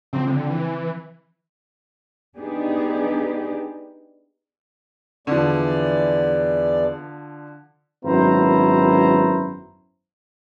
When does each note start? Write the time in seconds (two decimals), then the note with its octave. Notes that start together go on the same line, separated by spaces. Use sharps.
0.13 C#3 F3 C4
0.27 D3 C4
0.50 E3
2.38 B3 D4 D#4 G4 G#4
5.27 E2 D3 F3 D5
8.05 G#1 F#2 B3 E4 C5 A#5